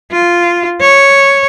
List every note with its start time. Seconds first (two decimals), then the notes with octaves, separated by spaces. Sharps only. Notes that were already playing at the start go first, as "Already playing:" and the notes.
0.12 F4
0.81 C#5